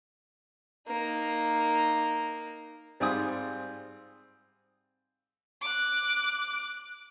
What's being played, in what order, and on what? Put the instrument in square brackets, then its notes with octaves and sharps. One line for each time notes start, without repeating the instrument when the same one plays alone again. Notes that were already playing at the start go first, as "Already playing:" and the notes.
[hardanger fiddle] A#3 D#4
[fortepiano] G#2 G3 C4 F4 G#5 D#6
[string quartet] D6 F#6